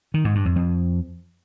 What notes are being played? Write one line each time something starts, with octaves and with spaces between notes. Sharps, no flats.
D#3
G#2
G2
F2
F2